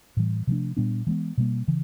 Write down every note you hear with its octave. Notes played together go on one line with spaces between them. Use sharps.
A2 E3 G3
C3 F3 A3 D4
A#2 G3 B3 D4
E3 G#3 B3
B2 G3 A#3
C#3 E3